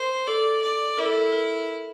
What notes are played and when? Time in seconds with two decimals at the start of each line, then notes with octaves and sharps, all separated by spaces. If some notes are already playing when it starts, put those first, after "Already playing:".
Already playing: A#4 C5
0.27 A4 D5
0.62 D5
0.97 E4 A#4
1.06 A4
1.14 A#4
1.32 A#4